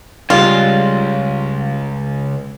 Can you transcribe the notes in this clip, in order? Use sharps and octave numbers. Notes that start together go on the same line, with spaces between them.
C#2 C#3 G3 G#3 F4